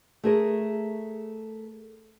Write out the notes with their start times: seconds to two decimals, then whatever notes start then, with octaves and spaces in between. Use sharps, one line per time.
0.24 A3 G#4 A#4